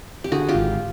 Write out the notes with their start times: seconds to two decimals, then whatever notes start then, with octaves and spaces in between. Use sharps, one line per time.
0.24 G4
0.32 D3 F#4 G#4
0.49 F4 G4
0.55 G#1